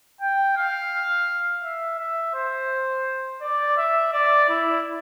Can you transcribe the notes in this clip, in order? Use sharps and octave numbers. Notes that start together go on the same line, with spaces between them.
G5
F5
E5
E5
C5
D5
E5
D5
E4